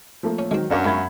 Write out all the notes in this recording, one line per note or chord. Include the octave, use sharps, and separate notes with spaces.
F3 A3 A#3
C#4
D#3 F#3 G#3 C4
F#2 C#4 D4 A#4 F5 F#5 C#6
G#2 F4 E5 B5 G#6